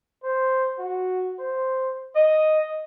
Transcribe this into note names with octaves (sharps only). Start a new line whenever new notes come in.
C5
F#4
C5
D#5